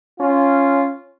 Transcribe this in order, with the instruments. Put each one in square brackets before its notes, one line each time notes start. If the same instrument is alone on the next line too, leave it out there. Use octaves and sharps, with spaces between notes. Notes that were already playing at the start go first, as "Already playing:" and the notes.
[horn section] C#4 F4